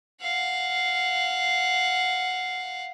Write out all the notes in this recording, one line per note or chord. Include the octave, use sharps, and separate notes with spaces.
F5 F#5